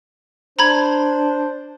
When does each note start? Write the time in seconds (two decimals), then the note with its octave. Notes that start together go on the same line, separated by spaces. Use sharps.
0.59 D4 C5 A#5 B5 G#6